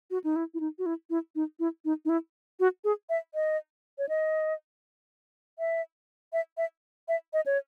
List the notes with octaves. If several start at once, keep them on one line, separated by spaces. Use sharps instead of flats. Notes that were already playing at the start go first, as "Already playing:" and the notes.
F#4
D#4
E4
E4
D#4
F#4
E4
E4
D#4
E4
D#4
D#4
E4
F#4
G#4
E5
D#5
C#5
D#5
E5
E5
E5
E5
D#5
C#5